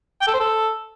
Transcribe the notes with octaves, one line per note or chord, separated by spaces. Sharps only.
G5
A4
C5
A4